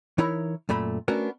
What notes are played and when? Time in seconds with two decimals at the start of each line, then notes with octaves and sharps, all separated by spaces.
0.18 E3 D#4 E4 A#4 C#5 B5
0.69 F#2 A#2 A3 B5
1.08 A3 B3 C#4 D4 F#4 A#4